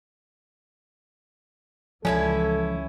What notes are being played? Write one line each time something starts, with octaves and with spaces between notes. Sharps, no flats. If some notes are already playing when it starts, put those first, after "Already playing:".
C#2 E3 F3 C#4 D#4 E4 A4